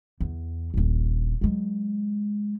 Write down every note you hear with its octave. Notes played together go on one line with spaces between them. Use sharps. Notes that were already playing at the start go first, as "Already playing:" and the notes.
E2
D#1 A#1
F#3 G#3